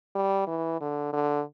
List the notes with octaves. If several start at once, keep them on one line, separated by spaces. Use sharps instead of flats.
G3
E3
D3
D3